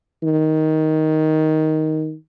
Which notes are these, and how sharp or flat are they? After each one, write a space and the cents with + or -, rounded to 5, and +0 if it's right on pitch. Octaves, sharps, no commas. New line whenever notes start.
D#3 +10